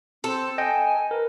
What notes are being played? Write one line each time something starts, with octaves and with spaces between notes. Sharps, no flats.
C4 A4
D#5 G5 G#5
A#4 B4